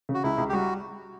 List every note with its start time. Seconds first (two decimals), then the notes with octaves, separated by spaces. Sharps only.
0.09 C#3
0.14 F#4
0.23 C#2 E4
0.38 C#2
0.49 G4
0.53 G3 F#4